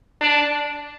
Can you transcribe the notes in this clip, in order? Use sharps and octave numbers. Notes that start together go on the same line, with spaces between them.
D4